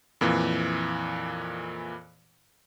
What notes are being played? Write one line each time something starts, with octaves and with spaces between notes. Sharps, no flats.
F2 A#2 E3